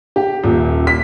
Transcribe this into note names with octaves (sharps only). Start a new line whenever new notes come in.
G4
D#1
B6